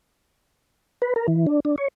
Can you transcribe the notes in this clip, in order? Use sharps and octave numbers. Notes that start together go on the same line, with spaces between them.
B4
A#4
E3
D4
D4
C#5